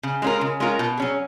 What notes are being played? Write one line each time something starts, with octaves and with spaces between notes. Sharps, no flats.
C#3
G#3 C#4 F4 A#4
C#3
G#3 C#4 F4 A#4
B2
F#3 C#4 G#4